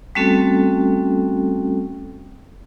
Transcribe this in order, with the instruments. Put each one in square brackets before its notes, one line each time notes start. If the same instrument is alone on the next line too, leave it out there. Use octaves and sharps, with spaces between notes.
[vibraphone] G3 A3 C4 C#4 F#4 A4